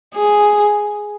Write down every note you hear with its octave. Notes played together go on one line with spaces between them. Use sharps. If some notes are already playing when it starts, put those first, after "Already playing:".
G#4